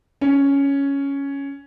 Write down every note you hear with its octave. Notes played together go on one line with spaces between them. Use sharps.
C#4